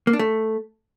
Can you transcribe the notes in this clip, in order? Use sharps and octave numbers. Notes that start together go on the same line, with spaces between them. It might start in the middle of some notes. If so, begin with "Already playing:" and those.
A#3
D4
A3